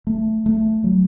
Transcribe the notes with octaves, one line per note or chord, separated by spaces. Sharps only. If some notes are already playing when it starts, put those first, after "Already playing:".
A3
A3
F#3